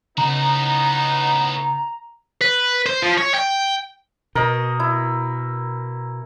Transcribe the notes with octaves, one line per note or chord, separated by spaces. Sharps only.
A2 C#3 B3 D#4 F#4 A#5
B4
C5
F3
C#5
G5
B2 A#4 D#5
E4